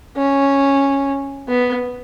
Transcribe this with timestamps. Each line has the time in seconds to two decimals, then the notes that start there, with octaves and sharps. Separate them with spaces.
0.17 C#4
1.48 B3